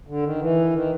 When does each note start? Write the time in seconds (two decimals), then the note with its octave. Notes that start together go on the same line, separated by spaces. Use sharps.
0.07 D3
0.23 D#3
0.39 E3
0.74 D#3